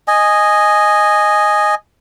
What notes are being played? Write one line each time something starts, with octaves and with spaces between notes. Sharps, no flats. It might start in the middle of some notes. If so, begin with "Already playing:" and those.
D#5 G#5